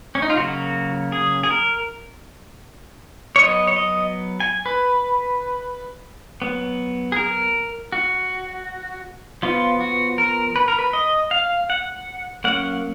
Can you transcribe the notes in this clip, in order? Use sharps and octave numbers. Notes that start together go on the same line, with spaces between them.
C#4
D#4
F4
C#3 F#3 A#3 F#4
G#4
G#4
A#4
C#5
F#3 B3 D#5
C#5
D#5
G#5
B4
F#3 B3
G#4
A#4
F#4
F3 B3 F4
F#4
A#4
B4
A#4
B4
D#5
F5
F#5
F#3 A#3 C#4 F#5